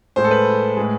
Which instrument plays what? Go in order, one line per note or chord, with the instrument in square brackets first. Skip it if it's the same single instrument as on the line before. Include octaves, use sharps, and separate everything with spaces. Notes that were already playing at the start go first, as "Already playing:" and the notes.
[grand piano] A2 G#3 C5
A4
B4
A2 G#3